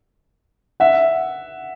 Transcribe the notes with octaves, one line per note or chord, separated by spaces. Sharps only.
E5 F#5